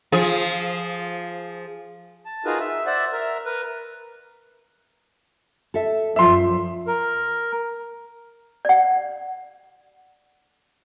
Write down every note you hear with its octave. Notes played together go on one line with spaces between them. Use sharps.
F3 G#4
A5
D#4 F4 F#4 G#4 A#4 B4
E5
C5 D5 E5 F#5
A#4 E5
A#4 B4
A4 E5
F#2 F3 F4 D5 E5 C6
A#4
D5 F#5